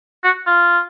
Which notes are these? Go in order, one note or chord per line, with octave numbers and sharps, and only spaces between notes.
F#4
F4